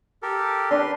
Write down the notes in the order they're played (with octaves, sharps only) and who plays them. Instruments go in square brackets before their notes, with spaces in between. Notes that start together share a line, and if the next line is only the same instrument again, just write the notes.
[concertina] G4 A4 A#4
[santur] D4 [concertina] B4 C6